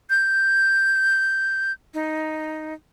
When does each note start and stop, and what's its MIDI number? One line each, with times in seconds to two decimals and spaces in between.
0.10 1.73 91
1.94 2.74 63